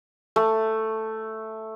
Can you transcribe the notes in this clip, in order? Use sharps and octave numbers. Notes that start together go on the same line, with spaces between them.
A3